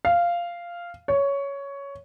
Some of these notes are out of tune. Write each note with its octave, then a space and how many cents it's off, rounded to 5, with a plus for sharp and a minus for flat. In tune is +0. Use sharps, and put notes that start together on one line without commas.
F5 -10
C#5 +10